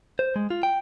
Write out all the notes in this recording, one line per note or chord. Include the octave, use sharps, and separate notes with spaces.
C5
G#3
F4
G5